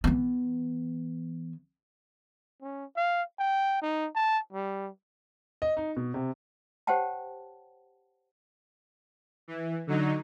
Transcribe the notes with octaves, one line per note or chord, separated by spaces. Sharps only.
E3 B3
C#4
F5
G5
D#4
A5
G3
D#5
D#4
B2
C3
G4 C5 C#5 F#5 G5 A5
E3
D3 F#3 D#4